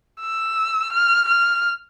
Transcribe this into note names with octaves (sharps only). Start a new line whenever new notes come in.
E6
F6
F6